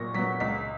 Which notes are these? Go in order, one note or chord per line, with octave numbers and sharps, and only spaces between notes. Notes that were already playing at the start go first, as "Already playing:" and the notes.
Already playing: A#2 F#3 B3 C#6 A#6
F#3 B3 B6
C#2 B6